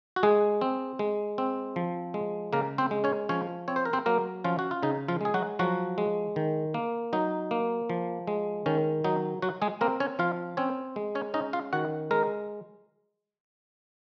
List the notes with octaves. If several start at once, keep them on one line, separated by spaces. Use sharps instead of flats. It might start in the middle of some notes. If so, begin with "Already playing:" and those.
F#4
G#3 G#4
C4
G#3
C4
F3
G#3
C#3 A#3 A#4
C4 C5
G#3
C#4 C#5
F3 C#4 C#5
C4 C#5
C5
A#4
C4 C5
F#3 A#3 A#4
F3 C#4 F4
F#4
F4
C#3 D#4
F3 F4
G#3 G#4
F#3 F#4
F3 F#3 F#4
G#3
D#3
A#3
F#3 D#4
A#3
F3
G#3
D#3 C#4
F#3 D#4
F#3 F#4
G#3 G#4
A#3 C4 A#4
C#4 C#5
F3 F4 F5
C4 C#4 C#5
G#3
C#4 C#5
C#4 D#4 D#5
F4 F5
D#3 F#4 F#5
G#3 A#4 A#5